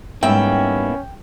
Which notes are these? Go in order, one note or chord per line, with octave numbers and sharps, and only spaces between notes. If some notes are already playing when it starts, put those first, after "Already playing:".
G#2 G3 A#3 B3 C#4 E4 E5 G5